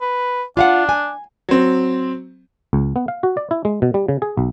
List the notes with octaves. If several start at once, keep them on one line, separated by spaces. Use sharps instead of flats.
B4
D4 F4 F5 F#5
G#5
F#3 C4
C#2
B3
F5
F#4
D5
E4
G#3
B2
G3
C#3
G#4
B1